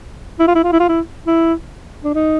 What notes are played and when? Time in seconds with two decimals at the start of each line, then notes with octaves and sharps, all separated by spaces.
0.40 E4
0.48 F4
0.55 E4
0.64 F4
0.72 E4
0.80 F4
0.89 E4
1.27 E4
2.04 D4
2.15 D#4